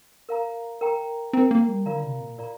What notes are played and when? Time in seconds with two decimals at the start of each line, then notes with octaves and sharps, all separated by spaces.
0.29 A#4 F5 A#5
0.81 A#4 G5 A#5
1.33 C4 A#4 G5 A#5
1.51 A#3
1.68 G3
1.86 D3 F4 A#4 D5 F5 A#5
2.04 C3
2.20 A#2
2.38 F4 A#4 D5 F5 A#5